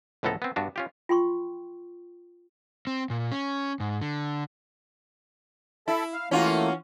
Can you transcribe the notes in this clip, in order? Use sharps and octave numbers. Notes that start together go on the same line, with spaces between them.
C#2 A2 F3 B3 A4 A#5
B3 C4
G2 B3 D4 F#4
C#4 F4 G4
F4 G5 C6 C#6
C4
A#2
C#4
G#2
D3
E4 A4 E5 A5
F5
E3 A3 A#3 C#4 F4 F#4